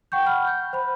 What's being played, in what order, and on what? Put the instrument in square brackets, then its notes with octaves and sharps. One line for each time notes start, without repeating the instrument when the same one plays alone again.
[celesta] F#5 G5 C#6 G6
F#5 B5 F6
G6
C5 B5